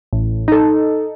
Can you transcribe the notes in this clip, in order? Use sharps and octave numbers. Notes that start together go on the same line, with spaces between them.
A1
D#4 A4